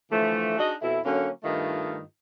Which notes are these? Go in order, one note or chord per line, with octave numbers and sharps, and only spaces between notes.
D3 E3 F3 A3
D4 D#4 F#4 G#4 D#5
F2 B2 E4
D3 F#3 A#3 C#4
G2 D#3 A3 D#4 F4